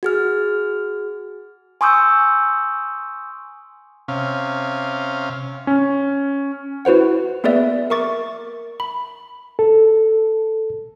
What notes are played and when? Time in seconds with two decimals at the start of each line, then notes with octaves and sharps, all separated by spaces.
0.03 F#4 G#4 F6
1.81 G#5 C6 C#6 D#6 E6 G6
4.08 C3 C#4 F5
5.67 C#4
6.85 E4 F#4 B4 C5 F#5
7.44 A#3 B3 G#4 B4 D5 E5
7.90 A#4 E5 C#6 D6 A6
8.80 B5
9.59 A4